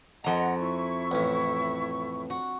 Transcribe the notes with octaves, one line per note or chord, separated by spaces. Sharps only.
F2 D#5 F#5 A#5
E4 C#6
A1 C#4
F#4